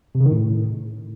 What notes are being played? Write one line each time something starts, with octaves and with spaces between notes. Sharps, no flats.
C3
C#3
D#3
A2